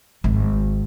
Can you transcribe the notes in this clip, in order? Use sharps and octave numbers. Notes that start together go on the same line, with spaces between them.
G#1